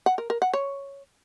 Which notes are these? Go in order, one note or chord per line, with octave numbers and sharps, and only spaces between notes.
F#5
A#4
A#4
F#5
C#5